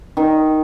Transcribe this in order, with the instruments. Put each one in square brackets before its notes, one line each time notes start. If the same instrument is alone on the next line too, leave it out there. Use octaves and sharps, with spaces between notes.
[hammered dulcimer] D#3